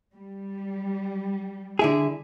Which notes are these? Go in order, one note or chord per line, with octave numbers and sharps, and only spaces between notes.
G3
D3 E4 G#4